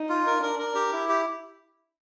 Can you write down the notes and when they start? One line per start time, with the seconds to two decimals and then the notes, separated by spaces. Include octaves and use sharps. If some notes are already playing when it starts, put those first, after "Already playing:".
Already playing: D#4
0.09 F4
0.27 A#4
0.42 D4 A#4
0.59 A#4
0.75 G4
0.93 E4
1.09 G4